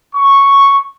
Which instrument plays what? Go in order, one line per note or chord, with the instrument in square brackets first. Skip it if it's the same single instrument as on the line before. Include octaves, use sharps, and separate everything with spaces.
[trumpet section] C#6